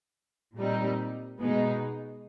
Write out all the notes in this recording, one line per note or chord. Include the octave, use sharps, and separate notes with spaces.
A#2 G3 C4 D#4
B2 G#3 B3 D#4